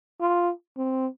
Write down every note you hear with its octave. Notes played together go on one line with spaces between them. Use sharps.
F4
C4